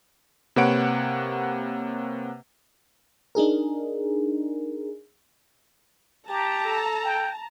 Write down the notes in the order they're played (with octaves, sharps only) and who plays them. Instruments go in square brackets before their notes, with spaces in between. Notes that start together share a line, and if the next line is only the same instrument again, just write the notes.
[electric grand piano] C3 A#3 B4 C#5 F#5 D7
[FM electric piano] D4 D#4 G#4 A#4
[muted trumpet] G4 [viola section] A5 A#5
[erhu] A4
[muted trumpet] G5